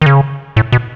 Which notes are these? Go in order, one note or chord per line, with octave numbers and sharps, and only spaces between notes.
D#3
C#3
A2
B2